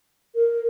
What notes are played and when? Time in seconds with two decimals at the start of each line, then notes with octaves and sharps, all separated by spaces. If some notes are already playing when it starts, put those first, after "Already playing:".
0.35 A#4